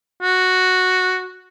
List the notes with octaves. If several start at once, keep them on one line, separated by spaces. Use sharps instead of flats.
F#4